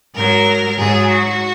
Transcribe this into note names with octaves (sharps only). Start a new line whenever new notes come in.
G#2 F#3 A#4
G#2 F#3 G#4
F#4